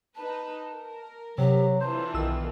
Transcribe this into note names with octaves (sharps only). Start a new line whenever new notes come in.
D#4 B4 A5
A#4
C3 F#3 G4
D3 E3 F4 C5 A5
B1 D#3 E6